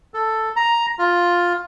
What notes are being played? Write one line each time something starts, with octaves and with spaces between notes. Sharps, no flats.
A4
A#5
F4